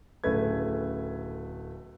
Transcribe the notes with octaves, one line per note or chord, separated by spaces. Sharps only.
D1 C#3 A3 B4 G#6